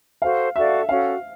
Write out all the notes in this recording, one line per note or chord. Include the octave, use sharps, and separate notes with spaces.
F#4 A4 C5 F5
F#4 A4 D5 E5 F5
C#4 F#4 A4 F5